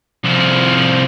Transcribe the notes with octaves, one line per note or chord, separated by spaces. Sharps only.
C2 F3